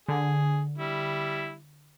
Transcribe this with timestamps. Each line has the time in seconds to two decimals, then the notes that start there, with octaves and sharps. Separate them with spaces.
0.09 D3 G#4
0.78 G3 E4